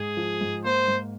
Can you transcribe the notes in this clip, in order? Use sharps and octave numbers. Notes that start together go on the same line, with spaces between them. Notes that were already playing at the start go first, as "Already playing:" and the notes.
Already playing: G#2 G#4
F3
G#2
A#3 C5
G#2